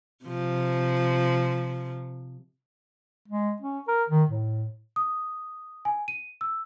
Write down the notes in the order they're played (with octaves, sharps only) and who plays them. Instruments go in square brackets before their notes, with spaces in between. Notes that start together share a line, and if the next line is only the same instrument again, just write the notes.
[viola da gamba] C3 F3
[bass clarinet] G#3
C#4
A#4
D#3
A2
[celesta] D#6
G#5
D#7
E6